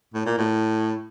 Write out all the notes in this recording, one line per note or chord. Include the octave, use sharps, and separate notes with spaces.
A2
A#2
A2